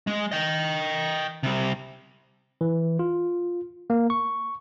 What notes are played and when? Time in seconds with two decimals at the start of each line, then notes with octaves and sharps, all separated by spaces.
0.07 G#3
0.32 D#5 G5
1.43 C3 G3
2.61 E3
2.99 F4
3.90 A#3
4.10 C#6